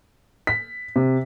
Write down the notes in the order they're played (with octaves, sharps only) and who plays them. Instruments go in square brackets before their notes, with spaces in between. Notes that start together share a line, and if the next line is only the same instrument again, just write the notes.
[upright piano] B6
C3